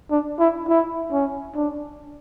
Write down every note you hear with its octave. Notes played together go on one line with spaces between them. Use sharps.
D4
E4
E4
C#4
D4